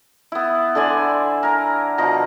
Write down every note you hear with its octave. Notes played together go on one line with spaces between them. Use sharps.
B3 E4
D3 C5 D5 G#5
A#4 A#5
B2 F3 A#5